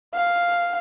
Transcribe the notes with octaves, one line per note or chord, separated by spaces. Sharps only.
F5